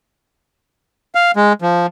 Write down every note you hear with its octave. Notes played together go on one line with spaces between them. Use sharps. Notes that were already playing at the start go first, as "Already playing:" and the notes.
F5
G#3
F3